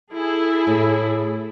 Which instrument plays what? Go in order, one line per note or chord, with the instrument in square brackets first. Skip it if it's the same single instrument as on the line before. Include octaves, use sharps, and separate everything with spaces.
[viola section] E4 G#4 A4
[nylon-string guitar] A2